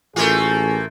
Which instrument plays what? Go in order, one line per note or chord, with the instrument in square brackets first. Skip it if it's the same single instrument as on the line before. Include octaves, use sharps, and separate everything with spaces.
[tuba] A1 [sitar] A3 A#3 F4 [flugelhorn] G#4